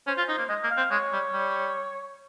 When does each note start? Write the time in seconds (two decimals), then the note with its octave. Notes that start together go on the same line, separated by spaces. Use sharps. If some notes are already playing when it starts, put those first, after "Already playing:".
0.07 C#4 C5
0.17 F4
0.29 D#4
0.38 A#3
0.49 G#3 D#5
0.64 A#3
0.70 F5
0.77 C4
0.91 G#3 C#5
1.12 G3
1.33 G3